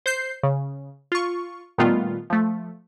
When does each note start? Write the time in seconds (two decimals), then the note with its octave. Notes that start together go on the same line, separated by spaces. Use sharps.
0.06 C5 G6 C7
0.43 C#3
1.12 F4 C#6
1.78 A#2 D#3 G3 A3 B3 F4
2.30 F3 A3